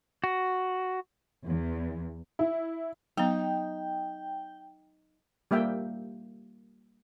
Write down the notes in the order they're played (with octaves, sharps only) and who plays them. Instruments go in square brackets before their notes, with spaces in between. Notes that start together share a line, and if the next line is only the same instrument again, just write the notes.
[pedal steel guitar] F#4
[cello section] E2
[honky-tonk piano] E4
[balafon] F#3 B3 [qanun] D#4 [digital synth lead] G5
[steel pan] G3 A#3 E5 G5